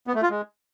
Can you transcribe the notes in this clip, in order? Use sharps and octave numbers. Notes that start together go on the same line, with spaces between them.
B3
A3
F4
G#3